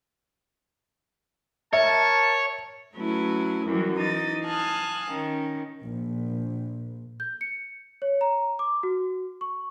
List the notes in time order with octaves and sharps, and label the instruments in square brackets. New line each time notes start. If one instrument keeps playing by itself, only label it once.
[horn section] A#4 A5 [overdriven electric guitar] C#5 [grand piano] E5
[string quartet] F#3 A3 C#4 E4 B4
F#2 E3 F#3 G3
E3 D#4 D#6 A6
F5 G#5 A5 D#6 F6 F#6
D#3 C#4
[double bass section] A#1
[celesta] G6
C#7
C#5
A#5
D6
F#4
C#6